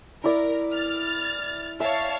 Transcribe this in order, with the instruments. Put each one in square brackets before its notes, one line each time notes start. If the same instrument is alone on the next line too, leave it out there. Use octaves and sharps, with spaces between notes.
[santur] E4 D5 [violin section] A#4
[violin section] F6 A6
[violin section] C#5 F5 A5 [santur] E5